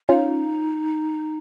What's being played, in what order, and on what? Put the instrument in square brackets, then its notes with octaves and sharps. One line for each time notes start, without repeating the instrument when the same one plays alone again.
[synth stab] C#4 F4 [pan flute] D#4